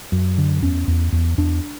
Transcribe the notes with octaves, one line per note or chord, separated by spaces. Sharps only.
F#2
D3
E2 C#4
E2
E2
E2 D4